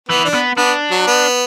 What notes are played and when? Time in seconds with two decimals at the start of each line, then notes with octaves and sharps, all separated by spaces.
0.09 E3 B3
0.25 D4
0.34 B3
0.57 B3 D4
0.91 F#3
1.07 B3